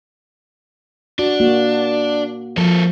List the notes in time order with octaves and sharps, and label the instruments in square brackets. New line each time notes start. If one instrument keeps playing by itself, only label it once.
[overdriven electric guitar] D4 [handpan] F#4
[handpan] A#3 F#4
[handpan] F3 [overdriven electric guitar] A#3 A4